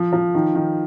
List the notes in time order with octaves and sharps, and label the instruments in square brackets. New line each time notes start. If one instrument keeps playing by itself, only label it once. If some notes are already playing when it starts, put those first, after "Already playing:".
Already playing: [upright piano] F3
F3
D#3
D#3